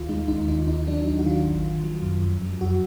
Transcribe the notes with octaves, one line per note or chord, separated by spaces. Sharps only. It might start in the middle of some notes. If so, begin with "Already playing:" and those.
Already playing: D#2 D#3 F4
G#3 D#4
D#2 D#4
D#3 D#4
D#2 D#4
F#3 D4
D4
D#2 D#4
F#4
D#3 F4
G#1
D#3
F#3
F#2
F2
F#3
F2 F#4